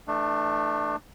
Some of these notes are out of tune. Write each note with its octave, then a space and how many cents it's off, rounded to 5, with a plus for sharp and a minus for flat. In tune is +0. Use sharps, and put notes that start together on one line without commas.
E3 +0 A3 +0 D4 +25